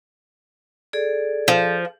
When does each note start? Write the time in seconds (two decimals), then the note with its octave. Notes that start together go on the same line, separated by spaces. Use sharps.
0.93 G#4 A4 D5
1.48 F3